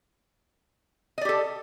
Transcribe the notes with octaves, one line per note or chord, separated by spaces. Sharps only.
G4 A4 D5 D#5